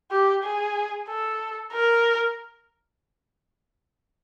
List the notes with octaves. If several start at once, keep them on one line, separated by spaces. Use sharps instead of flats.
G4
G#4
A4
A#4